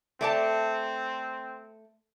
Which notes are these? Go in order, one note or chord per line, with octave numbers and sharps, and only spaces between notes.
A3 C4 D5 A5